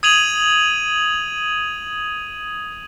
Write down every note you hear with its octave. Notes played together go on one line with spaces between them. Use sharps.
D#6 G#6 D#7 F7 F#7